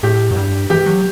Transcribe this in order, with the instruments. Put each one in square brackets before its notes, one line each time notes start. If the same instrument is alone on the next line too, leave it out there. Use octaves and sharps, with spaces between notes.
[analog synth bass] A2 [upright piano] G4
[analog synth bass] F#2
G2
[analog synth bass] E3 [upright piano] G4
[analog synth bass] F#3